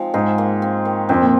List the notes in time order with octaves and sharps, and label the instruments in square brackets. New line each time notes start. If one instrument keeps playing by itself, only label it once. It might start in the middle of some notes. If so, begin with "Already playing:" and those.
Already playing: [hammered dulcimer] F3 G#3 C4 D#4
[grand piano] G#2 [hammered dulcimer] G#4
[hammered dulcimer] A#3
C4
D#3
[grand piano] F2 [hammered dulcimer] C4
[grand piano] A#2